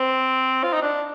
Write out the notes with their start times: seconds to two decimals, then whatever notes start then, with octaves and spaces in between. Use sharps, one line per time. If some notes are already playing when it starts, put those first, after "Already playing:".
Already playing: C4
0.63 F4
0.73 D#4
0.82 D4